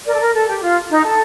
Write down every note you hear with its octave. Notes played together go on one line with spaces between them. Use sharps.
A#4 D5
A4
A#4
A4
G4
F4
D#4
A4